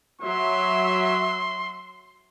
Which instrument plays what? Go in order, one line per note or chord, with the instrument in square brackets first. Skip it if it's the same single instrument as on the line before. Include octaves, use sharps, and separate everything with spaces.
[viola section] F#3 E5 [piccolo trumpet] C6